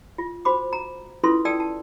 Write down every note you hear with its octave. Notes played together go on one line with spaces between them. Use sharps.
F4
F#4 C5 B5 D6
A#5
C#4 E4 F4 A4 B4 C6
A4 D5 G5 A5 E6
A5